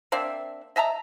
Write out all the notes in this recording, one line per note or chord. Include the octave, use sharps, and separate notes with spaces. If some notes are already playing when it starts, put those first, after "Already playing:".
A#3 C4 D4 E5
D#5 E5 A5 A#5